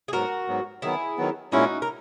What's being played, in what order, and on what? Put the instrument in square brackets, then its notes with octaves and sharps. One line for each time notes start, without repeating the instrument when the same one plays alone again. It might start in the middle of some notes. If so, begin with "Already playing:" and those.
[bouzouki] G#4
[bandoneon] G#2 F#3 B3 [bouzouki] F#4 A#4
[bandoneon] G#2 F#3 B3
[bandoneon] D#3 F#3 B3 [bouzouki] E4 G#4
[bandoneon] D#3 F#3 B3
[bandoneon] A#2 G#3 C#4 E4 [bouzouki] D#4 F#4
[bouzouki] A#4